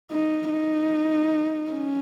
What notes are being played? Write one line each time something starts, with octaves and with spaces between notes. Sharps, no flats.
D#4
D#4
C#4